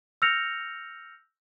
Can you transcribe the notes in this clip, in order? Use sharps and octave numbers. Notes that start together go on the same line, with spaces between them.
E6 F6 G6 A#6 C#7 F7